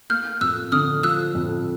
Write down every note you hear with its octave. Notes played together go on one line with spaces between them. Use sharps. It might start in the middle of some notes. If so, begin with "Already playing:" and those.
A#3 F6 G6
F2 E6 F#6
D3 D#6 F6
F3 E6 F#6
F2